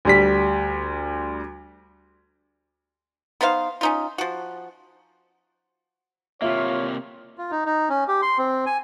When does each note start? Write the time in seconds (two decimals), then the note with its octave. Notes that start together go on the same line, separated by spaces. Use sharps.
0.05 D2 G3 B6
3.41 B3 D#4 C5 F5
3.81 C#4 D#4 F4
4.18 F3 F#4
6.42 C3 A#3 F4 C#5 E5
7.38 F4
7.51 D#4
7.65 D#4
7.89 C#4
8.08 G4
8.22 C6
8.38 C4
8.66 G#5